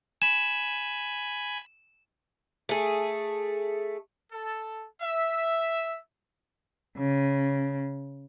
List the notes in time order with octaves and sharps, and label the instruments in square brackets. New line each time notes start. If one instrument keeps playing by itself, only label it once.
[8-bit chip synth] G#5 B5 [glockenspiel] E7
[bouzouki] A3 G#4
[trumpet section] A4
E5
[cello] C#3